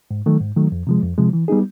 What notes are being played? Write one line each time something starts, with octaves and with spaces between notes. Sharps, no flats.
G#2
D#3 F#3 A3
G#2
D#3 F#3 A3
F2
C3 F3 G#3
F2
C3 F3 G#3
E3
G3 B3 D#4 G#4